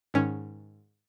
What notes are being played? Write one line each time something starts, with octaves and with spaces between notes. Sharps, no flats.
G#2 D#3 C#4